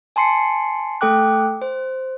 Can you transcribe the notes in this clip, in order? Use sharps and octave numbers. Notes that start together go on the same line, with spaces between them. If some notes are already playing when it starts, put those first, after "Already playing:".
G#5 A5 C6 C7 C#7
A3 A4 G5 D6 F#6
C5